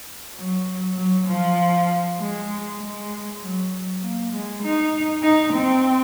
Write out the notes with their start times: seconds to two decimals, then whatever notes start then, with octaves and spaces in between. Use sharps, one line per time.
0.36 F#3
0.97 F#3
1.27 F3
2.19 G#3
2.80 G#3
3.40 F#3
4.02 A#3
4.32 G#3
4.63 D#4
5.23 D#4
5.53 C4